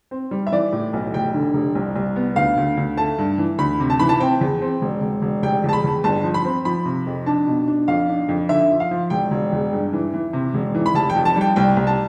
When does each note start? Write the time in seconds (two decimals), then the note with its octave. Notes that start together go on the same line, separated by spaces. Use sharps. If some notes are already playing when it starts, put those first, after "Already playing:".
0.11 C4
0.31 G3
0.47 E5
0.52 E3 D5
0.73 A2
0.93 B1
1.13 F1 G5
1.34 D3
1.54 F1
1.75 C2
1.96 C2
2.16 B3
2.36 D2 F5
2.57 D2
2.77 D2
2.97 A3 A5
3.18 G2
3.38 E3
3.58 D2 B5
3.80 C3
3.90 A5
3.99 E3 B5
4.09 A5
4.20 C4 G5
4.41 E2
4.62 C4
4.82 E1
5.02 E1
5.22 E1
5.43 F1 G5
5.64 E2
5.69 A5
5.73 B5
5.84 E2
6.04 G1 A5
6.24 F3
6.34 B5
6.45 C4
6.65 F3 B5
6.85 C3
7.07 F2
7.26 D4 A5
7.47 B2
7.68 D4
7.88 F2 F5
8.09 D4
8.28 F2
8.49 D3 E5
8.70 F3
8.80 F5
8.91 F3
9.10 E1 G5
9.31 E1
9.52 E2
9.73 G2
9.93 E3
10.13 E3
10.33 C3
10.54 E1
10.75 E3
10.86 B5
10.94 F1 A5
11.10 G5
11.16 F2
11.25 A5
11.36 G3
11.41 G5
11.56 C2 G5
11.77 C2
11.87 A5